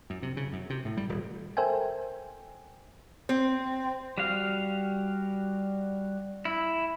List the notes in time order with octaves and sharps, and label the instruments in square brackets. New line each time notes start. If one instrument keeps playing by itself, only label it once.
[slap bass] F#2
C3
C#3
F#2
C3
A2
G3
D#1
[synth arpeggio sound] A4 A#4 C5 E5 G5 G#5
[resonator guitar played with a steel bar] C4
[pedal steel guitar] G3 F#4 F5
E4